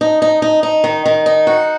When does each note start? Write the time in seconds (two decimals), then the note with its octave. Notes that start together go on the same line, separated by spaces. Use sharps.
0.01 D#4
0.22 D#4
0.42 D#4
0.63 D#4
0.84 D#3
1.06 D#3
1.26 D#4
1.47 F#4